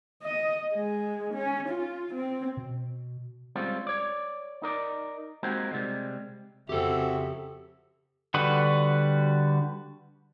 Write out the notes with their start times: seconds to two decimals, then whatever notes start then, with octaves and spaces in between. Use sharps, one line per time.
0.22 D#5
0.74 G#3
1.34 C#4
1.69 F4
2.14 C4
2.57 B2
3.56 G3 G#3 C4 C#4 F4
3.87 C#5 D5
4.62 D#4 A#4 D5
5.43 G#3 A#3 C4 D#4 F#4 G4
5.72 C3 G3 G#3
6.69 F2 C#3 C4 F#4 G4 A4 E5
8.34 D3 G3 F#4 B4 D#6